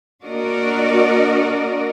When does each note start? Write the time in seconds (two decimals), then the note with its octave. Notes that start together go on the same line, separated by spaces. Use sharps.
0.25 A#3 D4 F#4 A#4 D5 D#5